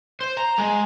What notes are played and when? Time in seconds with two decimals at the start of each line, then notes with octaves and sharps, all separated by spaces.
0.21 C5
0.37 A#5
0.58 G#3